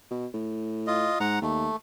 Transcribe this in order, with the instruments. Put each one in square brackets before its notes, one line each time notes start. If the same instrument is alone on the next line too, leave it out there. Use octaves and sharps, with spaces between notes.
[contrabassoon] B2
A2
[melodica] F4 D#5
[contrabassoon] G#2 [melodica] F#5 A#5
[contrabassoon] D#2 [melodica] A3